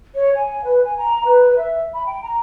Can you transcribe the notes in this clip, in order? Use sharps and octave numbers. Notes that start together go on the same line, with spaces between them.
C#5
G#5
B4
G#5
A#5
B4
E5
B5
G5
A#5